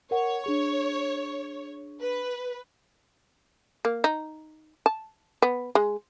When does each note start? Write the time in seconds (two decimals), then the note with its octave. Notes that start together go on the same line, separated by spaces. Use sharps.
0.11 A#4 C#5 F#5
0.44 D4 G#4 C#6
2.00 B4
3.85 A#3
4.04 D#4
4.86 A5
5.42 B3
5.75 G#3